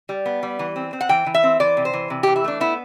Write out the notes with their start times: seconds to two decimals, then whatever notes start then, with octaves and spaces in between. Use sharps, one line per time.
0.09 G3
0.26 B3
0.43 G3
0.59 E3
0.76 C4
0.93 C4
1.01 F#5
1.09 E3 G5
1.26 E3
1.35 E5
1.43 C4
1.60 E3 D5
1.77 C3
1.85 C5
1.93 E3
2.10 C3
2.23 E3 G4
2.36 E4
2.44 A3 D4
2.60 B3 E4